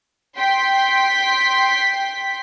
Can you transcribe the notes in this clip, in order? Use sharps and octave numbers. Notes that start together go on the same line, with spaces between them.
G5 C6 B6